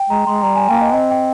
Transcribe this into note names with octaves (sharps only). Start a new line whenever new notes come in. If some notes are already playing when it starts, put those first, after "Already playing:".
Already playing: G5
G#3 A#5
G#3 C6
G3 A#5
G#5
A#3 G5
D#5
C4 D#5
G5